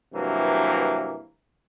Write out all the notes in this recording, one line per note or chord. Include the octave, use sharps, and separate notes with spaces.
G2 C3 E3 F#3 A#3